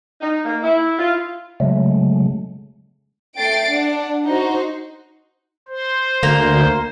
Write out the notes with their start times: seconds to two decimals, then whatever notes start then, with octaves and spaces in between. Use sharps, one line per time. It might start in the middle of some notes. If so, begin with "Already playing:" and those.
0.21 D#4
0.45 A#3
0.63 E4
0.99 F4
1.60 C#3 F#3 G#3 A3
3.37 A3 G5 A6 C7 D7
3.69 D4 F#5
4.27 D#4 F#4 C5
5.68 C5
6.23 D2 A#3